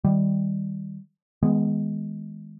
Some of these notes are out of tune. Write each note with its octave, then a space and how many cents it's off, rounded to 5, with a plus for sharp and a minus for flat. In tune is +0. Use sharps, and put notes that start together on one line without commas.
D#3 +10 G3 +0
D#3 +45 G#3 +0 B3 +0